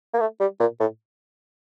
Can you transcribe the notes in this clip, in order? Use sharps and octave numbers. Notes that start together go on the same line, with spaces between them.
A#3
A3
G3
A#2
A2